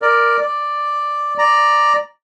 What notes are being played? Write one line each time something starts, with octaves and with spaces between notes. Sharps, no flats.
A#4 D5
D5
D5 A#5